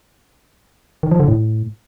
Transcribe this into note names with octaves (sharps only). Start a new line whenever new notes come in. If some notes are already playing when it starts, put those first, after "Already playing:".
D#3
F3
D3
A2